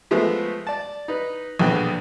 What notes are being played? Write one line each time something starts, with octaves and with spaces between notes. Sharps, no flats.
F3 G#3 A3 B3
D5 A5
D#4 B4
A#1 E2 B2 D3 B4 G5